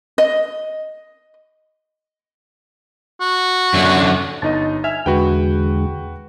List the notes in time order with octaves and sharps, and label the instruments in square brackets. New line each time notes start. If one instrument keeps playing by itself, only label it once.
[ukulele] D#5
[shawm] F#4
[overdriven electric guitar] F#2 D3
[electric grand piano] G1 D#4 D#5 [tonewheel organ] A5
[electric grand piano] E5 [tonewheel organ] G#5 F6
[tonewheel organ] E2 D3 G#3 [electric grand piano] F#4 B4 G5